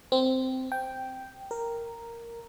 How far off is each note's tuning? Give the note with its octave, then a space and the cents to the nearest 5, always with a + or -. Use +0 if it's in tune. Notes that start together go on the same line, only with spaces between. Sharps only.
C4 -10
G5 -5
A#4 -5